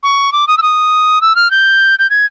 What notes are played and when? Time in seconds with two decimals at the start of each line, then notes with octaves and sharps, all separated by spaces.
0.03 C#6
0.33 D6
0.48 D#6
0.58 E6
0.62 D#6
1.21 E6
1.36 F6
1.51 G6
1.99 G6
2.10 G#6